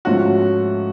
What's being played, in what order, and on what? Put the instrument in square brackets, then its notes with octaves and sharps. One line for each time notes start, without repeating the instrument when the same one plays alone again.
[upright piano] G#2 F3 A3 C#4 F4 [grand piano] F#4